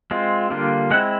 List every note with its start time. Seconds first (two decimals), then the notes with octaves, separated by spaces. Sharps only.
0.11 G#3 C4 F4
0.50 D3 G3 A#3 D4 F4
0.91 G#3 C4 E4 F#5